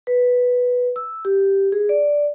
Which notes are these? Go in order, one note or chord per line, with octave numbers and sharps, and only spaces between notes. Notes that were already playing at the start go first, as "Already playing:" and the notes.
B4
E6
G4
G#4
D5